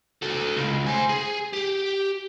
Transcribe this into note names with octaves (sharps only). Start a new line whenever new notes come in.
F#4 A4
C#2
C5 G#5
G#4
G4